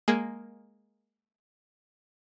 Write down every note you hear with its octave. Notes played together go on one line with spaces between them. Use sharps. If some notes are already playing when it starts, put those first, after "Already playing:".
G#3 A#3 G#4